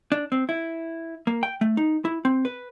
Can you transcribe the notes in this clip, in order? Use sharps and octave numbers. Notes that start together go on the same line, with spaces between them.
D4
C4
E4
A#3
G5
A3
D#4
E4
C4
B4